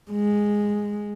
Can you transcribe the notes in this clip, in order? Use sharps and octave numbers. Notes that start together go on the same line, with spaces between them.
G#3